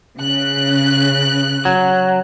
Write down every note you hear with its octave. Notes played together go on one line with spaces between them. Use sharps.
C#3 F#6
F#3